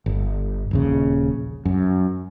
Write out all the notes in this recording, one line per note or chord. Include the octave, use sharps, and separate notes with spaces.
G1
D#1 A#1 C#3
F#2